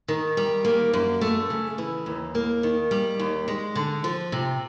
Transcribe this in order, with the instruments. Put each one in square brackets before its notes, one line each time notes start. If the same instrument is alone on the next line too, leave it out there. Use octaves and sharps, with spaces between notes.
[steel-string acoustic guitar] D#3
G3
A#3
F#2
A3
C#3
E3
D#2
A#3
D#3
G3
D#2
G#3
D3
F3
C3